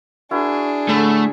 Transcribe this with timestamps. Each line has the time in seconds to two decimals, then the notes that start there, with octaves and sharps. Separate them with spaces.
0.31 D4 E4 F#4 G#4 A#4
0.89 A2 D3 A3 A4 B5